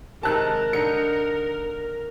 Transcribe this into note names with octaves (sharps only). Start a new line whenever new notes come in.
C3 D#3 G#3 A#4 A5 F#6
D3 D#4 C#7